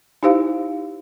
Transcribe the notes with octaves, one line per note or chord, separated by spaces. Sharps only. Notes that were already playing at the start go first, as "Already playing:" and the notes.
D#4 E4 G4 C5 F5